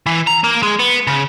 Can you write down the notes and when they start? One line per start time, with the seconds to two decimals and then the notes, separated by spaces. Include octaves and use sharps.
0.06 E3
0.27 A#5
0.44 A#3
0.63 G#3
0.79 B3
1.07 C#3